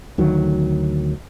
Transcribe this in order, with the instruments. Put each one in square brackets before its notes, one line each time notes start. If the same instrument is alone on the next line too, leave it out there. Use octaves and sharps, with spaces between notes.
[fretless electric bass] D2 D#3 F#3